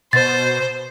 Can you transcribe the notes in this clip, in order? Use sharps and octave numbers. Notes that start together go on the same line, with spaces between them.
B2 C5 A6